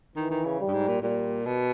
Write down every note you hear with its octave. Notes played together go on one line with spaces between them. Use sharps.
D#3 E3
D#3
C#3
G3
G2
G#2
A#2
A#2 G3
B2